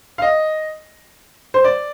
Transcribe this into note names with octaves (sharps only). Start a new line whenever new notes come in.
F5
D#5
C5
D5